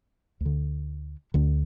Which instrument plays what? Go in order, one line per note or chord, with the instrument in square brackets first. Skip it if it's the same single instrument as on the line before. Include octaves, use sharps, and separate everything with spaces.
[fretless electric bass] D2
D3
D2 D3